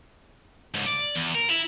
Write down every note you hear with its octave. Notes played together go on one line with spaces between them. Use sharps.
C#2 G#2
D5
E2
A#4
E4